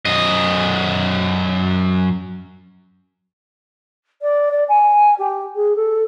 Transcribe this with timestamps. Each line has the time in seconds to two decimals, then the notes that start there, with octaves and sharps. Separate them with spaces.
0.05 F#2 D#5
4.22 D5
4.51 D5
4.69 G#5
5.19 G4
5.56 G#4
5.76 A4